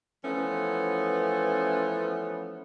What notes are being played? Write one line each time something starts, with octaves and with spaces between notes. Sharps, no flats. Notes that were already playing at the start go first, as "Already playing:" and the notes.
E3 F3 A3 B3 C#4